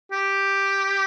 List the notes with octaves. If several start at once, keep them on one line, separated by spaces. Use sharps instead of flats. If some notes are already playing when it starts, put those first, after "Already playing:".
G4